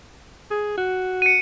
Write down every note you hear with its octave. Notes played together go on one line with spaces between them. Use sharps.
G#4
F#4
C#7 D#7